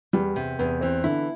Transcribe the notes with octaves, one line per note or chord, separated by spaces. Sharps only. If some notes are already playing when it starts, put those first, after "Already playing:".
E2 G3
C3
E2 B3
E3 C4
D3 E4